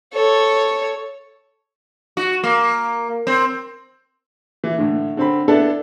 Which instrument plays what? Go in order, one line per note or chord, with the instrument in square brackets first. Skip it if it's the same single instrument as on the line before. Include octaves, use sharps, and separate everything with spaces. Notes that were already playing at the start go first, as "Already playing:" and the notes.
[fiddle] A4 C#5
[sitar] F#4
A#3
C4
[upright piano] E3
A2 D3
D3 C4 B5
B3 D4 E4 A4